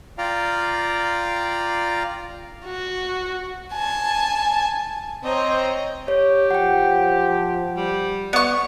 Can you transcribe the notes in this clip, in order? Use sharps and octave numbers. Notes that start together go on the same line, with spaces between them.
F4 D5 F5 G5 A#5
F#4
G#5 A5
C4 C5 C#5 D#5 A#5
G4 C#5
F3 F#5 G5
G3
B3 D5 C#6